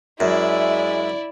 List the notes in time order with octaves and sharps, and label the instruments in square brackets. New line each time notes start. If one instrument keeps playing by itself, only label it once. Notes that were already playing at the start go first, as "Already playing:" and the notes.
[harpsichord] F#2 [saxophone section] G#3 E5 [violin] E4 D5